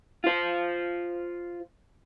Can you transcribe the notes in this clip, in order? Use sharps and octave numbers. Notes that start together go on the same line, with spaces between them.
F4 C5